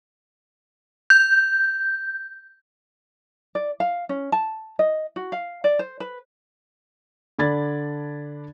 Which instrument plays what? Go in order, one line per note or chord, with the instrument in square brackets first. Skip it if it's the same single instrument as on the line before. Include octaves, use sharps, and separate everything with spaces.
[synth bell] G6
[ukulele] D5
F5
C#4
A5
D#5
F#4
F5
D5
C5
B4
[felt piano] D3 D4 D5 B5 G#6 A6